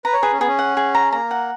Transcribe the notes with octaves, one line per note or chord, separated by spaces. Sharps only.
B4 A#5
C#5
G#4 B4
C#4
B3 G#4
C#4
F#5
G#4
A#5
A#3 A#5
F#5